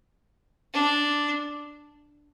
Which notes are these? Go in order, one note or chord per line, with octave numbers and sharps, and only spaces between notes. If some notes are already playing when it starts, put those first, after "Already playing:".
D4